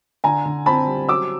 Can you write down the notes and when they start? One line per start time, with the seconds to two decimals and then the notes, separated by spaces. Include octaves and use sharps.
0.24 D3 G#5 A#5
0.45 D3
0.66 C4 A5 B5
0.87 G3
1.09 F#3 D6 E6